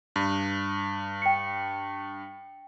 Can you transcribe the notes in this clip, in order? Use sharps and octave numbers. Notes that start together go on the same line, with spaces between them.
G2
G5 C#7